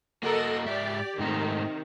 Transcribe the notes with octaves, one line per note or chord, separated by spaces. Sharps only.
A#3 F#4 A4 A#4 D#5
G#2 G4 D5 E5
G#2 C3 D#3 A3 A#5